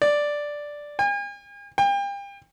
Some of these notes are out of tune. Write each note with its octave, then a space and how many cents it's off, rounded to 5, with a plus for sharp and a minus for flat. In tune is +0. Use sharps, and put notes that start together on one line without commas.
D5 +0
G#5 -45
G5 +35